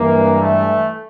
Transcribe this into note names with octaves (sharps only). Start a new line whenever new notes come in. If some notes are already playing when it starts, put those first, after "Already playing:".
Already playing: G2 E3 G#3 A#3
A3